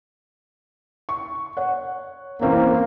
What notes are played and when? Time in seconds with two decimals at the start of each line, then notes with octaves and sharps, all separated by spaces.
1.09 C#6
1.57 C#5 F#5
2.41 E2 A#3 C4 C#4